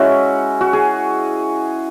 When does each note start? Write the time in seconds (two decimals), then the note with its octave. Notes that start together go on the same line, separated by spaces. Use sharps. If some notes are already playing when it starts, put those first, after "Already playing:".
Already playing: G#3 C#4 E4 F#4
0.61 F#4
0.73 G#4